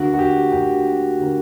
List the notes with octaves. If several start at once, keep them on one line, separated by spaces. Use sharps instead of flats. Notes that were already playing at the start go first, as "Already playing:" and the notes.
Already playing: D2 D3 A#3 F#4
F#4
G4
D2 D3 A#3 G4
D3 A#3